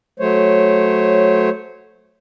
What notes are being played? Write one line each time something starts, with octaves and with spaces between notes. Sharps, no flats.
F#3 A3 C5 C#5